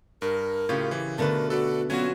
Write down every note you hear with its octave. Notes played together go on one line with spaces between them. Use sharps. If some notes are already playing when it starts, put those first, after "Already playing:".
G2 A#4
A2 C#3 F4 G4 C#5
E3
B2 D3 A3 A#4 B4 A5
F#4 A4 B4 D5
F#3 B3 C#4 F4 F#4 E5 G#5